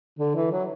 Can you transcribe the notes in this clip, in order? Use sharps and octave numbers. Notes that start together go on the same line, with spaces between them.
D3
E3
F#3